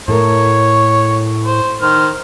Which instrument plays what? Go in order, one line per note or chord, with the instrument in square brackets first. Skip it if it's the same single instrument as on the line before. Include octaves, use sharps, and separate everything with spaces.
[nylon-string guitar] A2 A4 A#4 [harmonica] C#5
[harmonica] C5
D#3 C5 F6